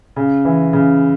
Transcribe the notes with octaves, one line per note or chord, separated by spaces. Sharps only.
C#3
E3
C#3